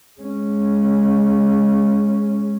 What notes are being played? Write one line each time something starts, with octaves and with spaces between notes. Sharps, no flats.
G#3 C#4